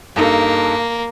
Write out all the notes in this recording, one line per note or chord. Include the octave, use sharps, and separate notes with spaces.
G2 A#3 D#4 A4